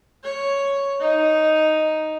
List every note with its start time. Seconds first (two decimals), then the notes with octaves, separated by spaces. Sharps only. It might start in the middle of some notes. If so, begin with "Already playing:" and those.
0.24 C#5
1.00 D#4